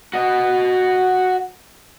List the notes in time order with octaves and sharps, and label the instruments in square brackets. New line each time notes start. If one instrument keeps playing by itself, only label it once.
[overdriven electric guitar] F#4 D#5